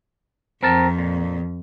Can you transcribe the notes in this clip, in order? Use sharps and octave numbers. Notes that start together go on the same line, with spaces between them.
F2 C4 A#4 A5
A#2